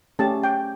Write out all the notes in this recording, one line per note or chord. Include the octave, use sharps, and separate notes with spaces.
A3 C#4 G4 A5
G5